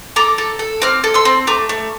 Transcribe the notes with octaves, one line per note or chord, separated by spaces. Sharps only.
A4 A#5 D6
A4
A4
C4 D6 F6
A4
C6 E6
C4
A3 A#5 D6
A3